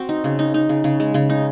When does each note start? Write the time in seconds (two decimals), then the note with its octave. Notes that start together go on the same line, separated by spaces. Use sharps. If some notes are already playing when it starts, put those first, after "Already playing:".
Already playing: C4 F#4
0.09 D#4
0.24 C#3
0.39 D#4
0.54 D#4
0.69 C#3
0.84 C#3
1.00 G#3
1.14 C#3
1.29 D#4